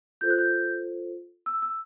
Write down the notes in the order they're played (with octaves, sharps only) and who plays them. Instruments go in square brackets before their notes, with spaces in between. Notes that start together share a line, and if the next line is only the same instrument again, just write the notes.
[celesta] F4 A4 C5 G6
F#6
G6
E6
E6